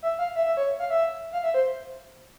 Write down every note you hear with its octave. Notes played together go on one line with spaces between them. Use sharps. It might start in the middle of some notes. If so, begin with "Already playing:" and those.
E5
F5
E5
E5
C#5
F5
E5
F5
E5
C5